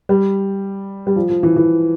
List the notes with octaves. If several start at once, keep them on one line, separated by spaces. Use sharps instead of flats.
G3
G3
F3
F3
E3
E3